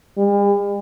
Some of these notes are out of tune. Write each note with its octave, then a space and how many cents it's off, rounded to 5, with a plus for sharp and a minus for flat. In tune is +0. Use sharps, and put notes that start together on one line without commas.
G3 +45